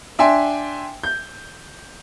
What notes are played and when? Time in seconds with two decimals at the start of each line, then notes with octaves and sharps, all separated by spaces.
0.19 D4 E5 G5 G#5 C6
1.03 G6